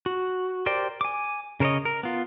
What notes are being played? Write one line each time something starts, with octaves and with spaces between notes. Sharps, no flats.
F#4
G4 A#4 C5 D5 G5
G#5 D6
C#3 A#4 C5 C#5 D#5
A#4
B3 F4